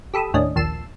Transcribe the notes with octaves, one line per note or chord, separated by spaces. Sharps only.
G4 A4 B5 D#6 E6
D#2 A2 C#4 D4 D#5
A#1 D#2 A5 E6 C7 E7